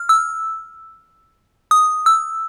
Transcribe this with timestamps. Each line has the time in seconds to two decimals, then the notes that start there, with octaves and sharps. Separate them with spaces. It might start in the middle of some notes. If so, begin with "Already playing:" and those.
Already playing: F6
0.09 E6
1.71 D#6
2.06 E6